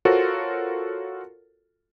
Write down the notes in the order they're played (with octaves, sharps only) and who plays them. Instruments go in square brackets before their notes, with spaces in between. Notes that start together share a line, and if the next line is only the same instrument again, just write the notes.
[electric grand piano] F4 F#4 A4 A#4 C5 C#5